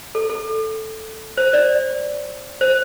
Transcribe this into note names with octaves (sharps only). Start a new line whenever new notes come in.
A4
A4
C5
D5
C5